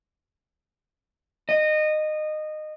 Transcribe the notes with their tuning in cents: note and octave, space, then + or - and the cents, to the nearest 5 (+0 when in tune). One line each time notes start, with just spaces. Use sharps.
D#5 -20